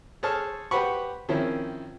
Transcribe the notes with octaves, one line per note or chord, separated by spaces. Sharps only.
G#4 A4 C5 C#5 A5 F6
G4 B4 C5 F#5 B5 C#6
D#3 F3 C4 C#4 E4